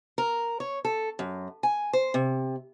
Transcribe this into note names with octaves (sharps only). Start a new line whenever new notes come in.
A#4
C#5
A4
F#2
G#5
C5
C3